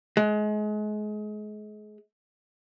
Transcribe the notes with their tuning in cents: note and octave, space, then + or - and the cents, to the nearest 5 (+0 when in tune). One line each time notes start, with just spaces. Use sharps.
G#3 +30